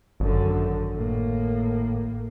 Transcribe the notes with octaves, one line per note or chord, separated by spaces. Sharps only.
G#1 F#2 D3
A2 A#3